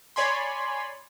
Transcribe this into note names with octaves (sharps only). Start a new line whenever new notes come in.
C#5 D5 G#5 B5 C6